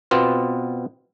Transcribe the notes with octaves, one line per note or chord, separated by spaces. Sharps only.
B2 B3 C4 F4